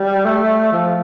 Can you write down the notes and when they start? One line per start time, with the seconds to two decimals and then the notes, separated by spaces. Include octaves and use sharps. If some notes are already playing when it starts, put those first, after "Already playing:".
Already playing: G3
0.25 A3
0.73 F3